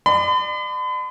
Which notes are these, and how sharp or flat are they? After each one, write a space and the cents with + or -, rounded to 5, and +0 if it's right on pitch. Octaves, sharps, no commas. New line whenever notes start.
D5 +40 B5 +45